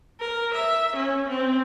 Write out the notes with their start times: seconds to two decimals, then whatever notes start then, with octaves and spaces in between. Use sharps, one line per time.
0.20 A#4
0.54 E5
0.96 C#4
1.29 C4